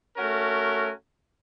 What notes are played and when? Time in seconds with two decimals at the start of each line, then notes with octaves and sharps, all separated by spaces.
0.16 A3 C#4 F#4 A#4